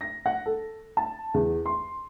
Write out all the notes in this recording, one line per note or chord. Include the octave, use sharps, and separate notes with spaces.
A#6
F#5
A4
A5
E2
C6